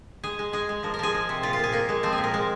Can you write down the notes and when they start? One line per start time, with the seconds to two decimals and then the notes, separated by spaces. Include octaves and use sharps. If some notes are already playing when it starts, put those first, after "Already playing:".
0.24 G#3 G#4
0.39 G#3
0.53 G#3 G#4
0.69 G#3
0.83 F3 A#4
0.94 A#4
0.99 F3 G#4
1.14 G#3
1.29 C3
1.43 A#2 F4
1.53 F4
1.59 A#2 G#4
1.72 A#2 A#3
1.89 G#3
2.03 F3 C4
2.13 G#4
2.18 A#2
2.24 A#4
2.34 G#3